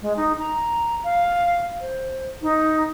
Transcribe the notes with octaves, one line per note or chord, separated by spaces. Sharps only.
G#3
D#4
A#5
F5
C5
D#4